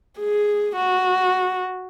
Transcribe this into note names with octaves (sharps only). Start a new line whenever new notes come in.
G#4
F#4